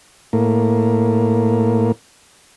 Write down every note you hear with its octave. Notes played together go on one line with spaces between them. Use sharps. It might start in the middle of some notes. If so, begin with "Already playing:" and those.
A2 A#3